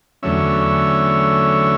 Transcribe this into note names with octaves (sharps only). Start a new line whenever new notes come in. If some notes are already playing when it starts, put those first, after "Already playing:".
E2 D3 F#3 A3 C#4 E5